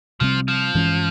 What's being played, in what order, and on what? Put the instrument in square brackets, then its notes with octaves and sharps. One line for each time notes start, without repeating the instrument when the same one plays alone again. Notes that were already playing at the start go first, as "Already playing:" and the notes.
[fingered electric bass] C3 G3 C4 [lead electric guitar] F3
[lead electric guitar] F3
[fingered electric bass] G2 E3 G#3 C#4